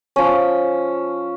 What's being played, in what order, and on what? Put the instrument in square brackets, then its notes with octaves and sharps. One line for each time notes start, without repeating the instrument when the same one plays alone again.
[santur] F3 C#4